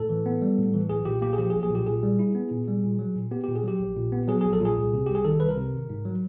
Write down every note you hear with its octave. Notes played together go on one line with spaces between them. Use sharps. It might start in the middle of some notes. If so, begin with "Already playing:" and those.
Already playing: A2 A4
E3
B3
G3
A2
E3
B1 G#4
A#2 G4
A#3 G4
G#4
F3 G4
G#4
B1
G#4
A#2 G4
A#2 G#4
G3
E4
B3
A#2
G3
A#2
F#3
A#2
B3 G4
A#2 G4
G#4
F#3 G4
A#1
A#2
B3
F#3 G#4
A#1 G#4
A4
A#2 G#4
C2
C3
C2 G4
G#4
D#3 A4
C2 B4
A#4
C3
G#1
G#2
F#3